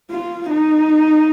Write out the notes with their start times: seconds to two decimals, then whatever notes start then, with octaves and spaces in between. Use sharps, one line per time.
0.11 F4
0.49 D#4